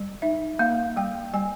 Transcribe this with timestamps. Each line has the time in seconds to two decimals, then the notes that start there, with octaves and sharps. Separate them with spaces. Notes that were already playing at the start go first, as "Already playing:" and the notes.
Already playing: G3
0.22 D#4 E5
0.59 A#3 F5
0.96 G3 G5
1.34 G3 G#5